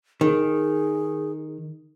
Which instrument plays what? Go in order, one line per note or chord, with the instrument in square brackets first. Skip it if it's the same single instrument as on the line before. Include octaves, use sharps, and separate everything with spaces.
[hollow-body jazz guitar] D#3 [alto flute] G#4